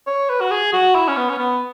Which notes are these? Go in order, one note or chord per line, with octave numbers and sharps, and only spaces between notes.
C#5
B4
F#4
G#4
F#4
E4
C#4
B3
C#4
B3